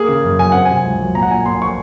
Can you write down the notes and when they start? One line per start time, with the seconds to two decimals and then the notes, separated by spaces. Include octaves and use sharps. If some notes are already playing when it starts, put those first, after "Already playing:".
Already playing: A#3 G#4
0.08 C#3
0.24 F#2
0.38 F#3 G#5
0.52 C4 F#5
0.66 C3 G#5
0.85 C#2
0.99 F#3
1.15 A#1 A#5
1.23 F#5
1.31 A#2 G#5
1.45 A#1 C6
1.62 F3 C#6